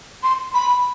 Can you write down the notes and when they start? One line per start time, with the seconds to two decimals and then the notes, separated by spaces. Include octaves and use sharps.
0.23 C6
0.54 B5